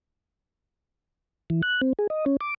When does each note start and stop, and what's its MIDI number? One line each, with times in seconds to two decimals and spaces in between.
1.50 1.62 52
1.62 1.81 90
1.81 1.93 60
1.99 2.07 68
2.10 2.25 75
2.26 2.37 61
2.41 2.54 86